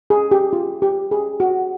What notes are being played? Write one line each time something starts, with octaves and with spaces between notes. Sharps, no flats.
G#4
G4
F4
G4
G#4
F#4